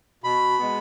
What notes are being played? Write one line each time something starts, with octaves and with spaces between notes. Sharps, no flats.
B2 B5
G#3 B3